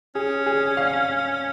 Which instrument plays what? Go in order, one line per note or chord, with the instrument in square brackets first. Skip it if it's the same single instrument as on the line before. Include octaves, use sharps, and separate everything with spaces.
[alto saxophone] C#4 [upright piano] G#4
[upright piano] G#4
F5